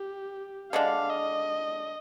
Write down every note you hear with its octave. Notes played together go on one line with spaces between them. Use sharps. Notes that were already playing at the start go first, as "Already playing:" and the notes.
Already playing: G4
D3 G#3 D4 F5
D#5